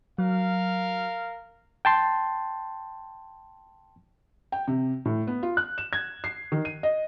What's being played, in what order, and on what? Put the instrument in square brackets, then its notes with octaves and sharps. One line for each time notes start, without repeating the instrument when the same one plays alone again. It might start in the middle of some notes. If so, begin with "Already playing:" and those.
[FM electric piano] F#3 [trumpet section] A#4 F5
[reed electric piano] G5 A5 C6
[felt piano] G5
C3
A2
B3
F4
F#6
E7
G#6
C7
D#3
D#7
D#5